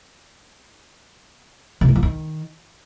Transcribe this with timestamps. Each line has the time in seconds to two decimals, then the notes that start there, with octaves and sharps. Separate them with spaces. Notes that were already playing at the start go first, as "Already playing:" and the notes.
1.81 C3
1.88 G3
1.95 F3
2.03 D#3